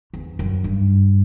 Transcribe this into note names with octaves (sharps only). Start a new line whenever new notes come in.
E2
F#2
G2